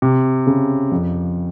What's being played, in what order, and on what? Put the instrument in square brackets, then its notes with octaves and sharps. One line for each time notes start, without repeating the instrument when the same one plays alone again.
[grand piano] C3
C#3
F2